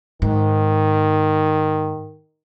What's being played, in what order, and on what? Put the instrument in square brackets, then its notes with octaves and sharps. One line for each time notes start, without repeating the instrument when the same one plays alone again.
[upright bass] G#2 [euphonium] D#3